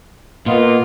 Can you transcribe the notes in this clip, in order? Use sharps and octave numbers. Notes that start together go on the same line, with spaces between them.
A#2 A#3 B3 F4 D#5